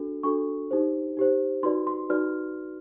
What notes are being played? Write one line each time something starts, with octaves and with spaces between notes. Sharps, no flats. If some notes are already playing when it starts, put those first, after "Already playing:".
Already playing: D4 F#4 A4
D4 F#4 A4 C#6
D#4 G4 C5
D#4 G4 C5
D#4 F#4 B4 D5 C6
C6
D#4 F#4 B4 D5 F6